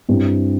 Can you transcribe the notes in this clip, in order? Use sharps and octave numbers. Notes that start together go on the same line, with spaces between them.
G2 G3 C4 E4